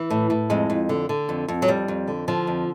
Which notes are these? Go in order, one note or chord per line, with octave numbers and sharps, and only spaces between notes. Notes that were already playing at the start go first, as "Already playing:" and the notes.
Already playing: E3
A2
A2
F2 G#3
F2
D3
D3
F2
F2
F#3
F2 G3
F2
D3
D3 F3
F2